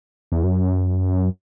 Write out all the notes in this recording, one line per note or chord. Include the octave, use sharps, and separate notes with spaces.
E2
F#2